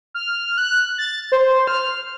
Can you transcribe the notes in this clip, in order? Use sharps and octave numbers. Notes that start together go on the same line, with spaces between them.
F6
F#6
A6
C5
F6